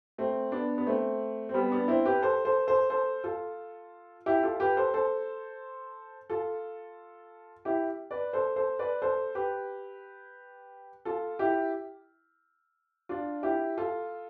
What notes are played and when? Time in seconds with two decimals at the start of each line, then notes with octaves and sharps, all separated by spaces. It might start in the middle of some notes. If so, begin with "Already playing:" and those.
0.18 A3 C4
0.52 B3 D4
0.78 B3
0.86 A3 C4
1.49 C4
1.54 G3 B3
1.72 B3 D4
1.88 C4 E4
2.06 G4 B4
2.22 A4 C5
2.45 A4 C5
2.67 A4 C5
2.90 A4 C5
3.24 F4 A4
4.26 E4 G4
4.43 F4 A4
4.60 G4 B4
4.77 A4 C5
4.94 A4 C5
6.30 F4 A4
7.65 E4 G4
8.11 B4 D5
8.33 A4 C5
8.56 A4 C5
8.79 B4 D5
9.02 A4 C5
9.35 G4 B4
11.05 F4 A4
11.39 E4 G4
13.09 D4 F4
13.43 E4 G4
13.77 F4 A4